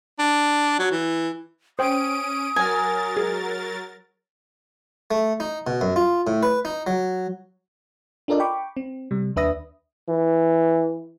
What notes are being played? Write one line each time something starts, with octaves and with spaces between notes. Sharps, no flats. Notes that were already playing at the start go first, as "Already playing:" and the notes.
D4
F#3
E3
C#4 C5 G5 D#6 D7 D#7
F#3 A#4 G#5 A6
G#4
A3
D#4
B2
F#2
F4
A2
B4
D#4
F#3
D4 F4 A4 A#4 D5 D#5
G5 B5 C#6 D6
C4
C3 G3
D#2 D4 B4 E5 D#6 A#6
E3